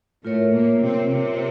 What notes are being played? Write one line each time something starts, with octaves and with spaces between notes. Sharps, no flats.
A2 A3 F4 A#4 C#5 E5
A#2 A#3
C3 C4
C3 C4